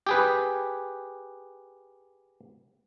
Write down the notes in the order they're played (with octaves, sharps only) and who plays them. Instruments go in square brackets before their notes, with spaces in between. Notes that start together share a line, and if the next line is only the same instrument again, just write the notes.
[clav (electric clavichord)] G4 G#4 B4